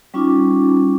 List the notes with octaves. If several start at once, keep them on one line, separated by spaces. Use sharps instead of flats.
G3 C#4 D#4 F4 D6